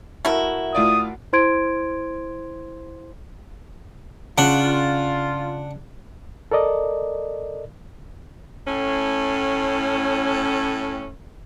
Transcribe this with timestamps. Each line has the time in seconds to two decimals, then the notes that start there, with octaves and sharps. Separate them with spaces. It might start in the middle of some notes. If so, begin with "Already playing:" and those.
0.25 A3 E4 F#4 A#4
0.75 A2 F4 D5 D#6
1.33 E4 C5 C6 G#6 D7
4.38 C#3 D4 F4 F#5
6.51 A4 A#4 D5 D#5
8.67 A2 C#4